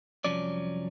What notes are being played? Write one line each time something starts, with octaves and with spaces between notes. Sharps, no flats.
C2 F2 F3 F#3 C#4 D5